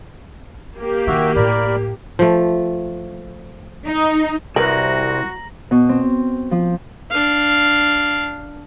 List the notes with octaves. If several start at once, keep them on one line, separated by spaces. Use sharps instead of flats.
A#3 G4
D#3 D4 F#4 E5
A2 A#4 D5 B5
F3 A3
D#4
C2 F#4 A#4 B4 A#5 A#6 F#7
B2
C4
F3
D4 F5